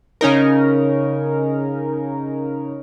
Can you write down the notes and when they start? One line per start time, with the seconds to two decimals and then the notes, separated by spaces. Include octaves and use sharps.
0.21 C#3 C#4 D#4 A#4